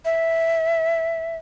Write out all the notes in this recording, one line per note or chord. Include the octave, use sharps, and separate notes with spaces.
E5